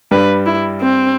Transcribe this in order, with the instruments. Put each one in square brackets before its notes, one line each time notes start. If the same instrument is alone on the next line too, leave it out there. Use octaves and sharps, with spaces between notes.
[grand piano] G2 G3 [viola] B4
[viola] E4
C4